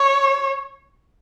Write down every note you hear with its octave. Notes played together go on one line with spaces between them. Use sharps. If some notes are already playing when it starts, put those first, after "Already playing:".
Already playing: C#5